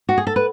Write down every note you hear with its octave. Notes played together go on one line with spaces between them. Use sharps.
F#4
G#4
A4
B4